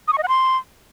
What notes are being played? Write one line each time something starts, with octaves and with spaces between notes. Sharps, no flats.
D#6
C#6
D#5
F#5
C6